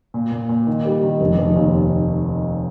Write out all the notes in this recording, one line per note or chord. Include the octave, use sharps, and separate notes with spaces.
A#2
A#2
A#2
D#3
G3
D#3
F1
F1
D#2